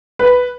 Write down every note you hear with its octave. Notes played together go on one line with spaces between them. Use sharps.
B4